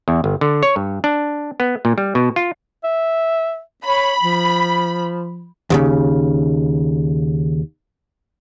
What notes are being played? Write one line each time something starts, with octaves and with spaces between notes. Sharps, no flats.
E2
G1
D3
C#5
G2
D4
B3
A#2
G3
B2
F4
E5
C#5 B5
F3
D#2 A#2 C#3